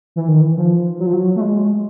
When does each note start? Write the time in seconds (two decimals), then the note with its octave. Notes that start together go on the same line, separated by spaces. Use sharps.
0.16 E3
0.28 D#3
0.41 E3
0.58 F3
0.99 F#3
1.07 F3
1.13 F#3
1.36 A3
1.41 G#3